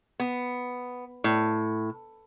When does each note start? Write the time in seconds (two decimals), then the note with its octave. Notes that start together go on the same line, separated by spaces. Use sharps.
0.20 B3
1.24 A2